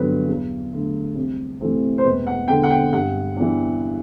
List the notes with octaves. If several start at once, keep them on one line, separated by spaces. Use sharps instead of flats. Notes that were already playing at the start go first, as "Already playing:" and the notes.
Already playing: G2 D3 F#3 B3 D4 B4
E2
D3 A3
C2
C3 E3 A3 C4
C5
E1 B4
F#5
E2 D3 G5
F#5
G5
G2 F#5
E3 B3 D4